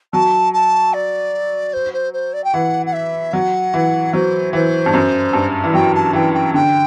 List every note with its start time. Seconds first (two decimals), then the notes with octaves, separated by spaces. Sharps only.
0.13 F#3 A5
0.53 A5
0.93 D5
1.73 C5
1.93 C5
2.13 C5
2.33 D5
2.44 G5
2.54 E3 F#5
2.86 F#5
2.93 E5
3.33 F#3 F#5
3.74 E3
4.13 F#3 C5
4.53 E3 C5
4.86 G2
4.94 F#2
5.33 G2
5.64 E3
5.74 F#3 G5
5.94 A5
6.13 E3 G5
6.33 G5
6.54 D3 G5